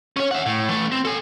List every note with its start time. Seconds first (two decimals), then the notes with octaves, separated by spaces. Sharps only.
0.16 C#4 C#5
0.31 E5 F#5
0.46 A2
0.69 E3 A3
0.92 C4
1.05 A4 G#5